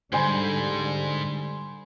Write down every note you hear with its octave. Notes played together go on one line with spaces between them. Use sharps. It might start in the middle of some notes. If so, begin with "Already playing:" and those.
G#2 D3 G3 C5 G#5 B5